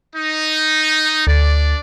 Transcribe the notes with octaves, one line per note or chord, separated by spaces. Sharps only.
D#4
D2 D4 D5